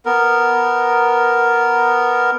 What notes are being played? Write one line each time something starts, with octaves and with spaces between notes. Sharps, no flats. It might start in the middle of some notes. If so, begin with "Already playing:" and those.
B3 A#4